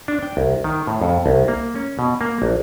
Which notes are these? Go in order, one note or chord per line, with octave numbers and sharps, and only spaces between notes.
D4
G5
C2
D#3
A2
F2
C2
A#3
C#4
B2
A#3
A#1